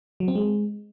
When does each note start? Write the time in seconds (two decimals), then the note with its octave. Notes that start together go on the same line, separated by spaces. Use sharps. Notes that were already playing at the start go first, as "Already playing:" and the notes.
0.20 F#3
0.28 C4
0.35 G#3